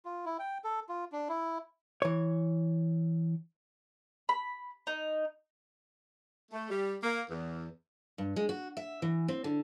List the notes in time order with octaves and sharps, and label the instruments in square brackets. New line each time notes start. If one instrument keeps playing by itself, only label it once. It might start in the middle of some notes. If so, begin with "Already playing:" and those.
[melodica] F4
E4
G5
A4
F4
D4
E4
[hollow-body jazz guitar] E3 C#5
[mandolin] B5
D#4
[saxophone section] A3
G3
A#3
E2
[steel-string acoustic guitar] G2
G#3
F#4
E5
E3
C4
D3